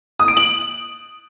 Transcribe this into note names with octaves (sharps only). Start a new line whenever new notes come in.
D#6
D7
F#7